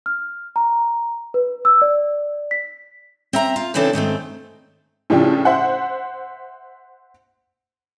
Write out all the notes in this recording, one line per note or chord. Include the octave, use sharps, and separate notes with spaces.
F6
A#5
B4
E6
D5
B6
C4 E5 A#5
F4
C#3 E3 C4 D4 E4 A4
G#2 D#3 A3 C4
A2 C#3 F3 D4 E4 G4
C5 E5 F#5